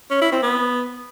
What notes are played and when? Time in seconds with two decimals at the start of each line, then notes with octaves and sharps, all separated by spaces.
0.11 C#4
0.21 E4
0.32 C4
0.43 B3